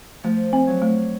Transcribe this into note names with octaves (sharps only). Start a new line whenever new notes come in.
F3 A3
C4
F#3
A3